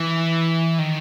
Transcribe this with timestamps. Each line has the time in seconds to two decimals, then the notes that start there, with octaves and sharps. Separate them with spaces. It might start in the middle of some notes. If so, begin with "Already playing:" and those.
Already playing: E3
0.79 D#3